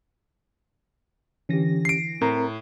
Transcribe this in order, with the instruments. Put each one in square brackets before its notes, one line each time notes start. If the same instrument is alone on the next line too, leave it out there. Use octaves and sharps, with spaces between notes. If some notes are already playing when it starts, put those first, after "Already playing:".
[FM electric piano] D3 E3 A#6 [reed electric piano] C#4 G4
[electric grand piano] C7 D7
[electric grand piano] A2 [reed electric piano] C4 A#4 A#5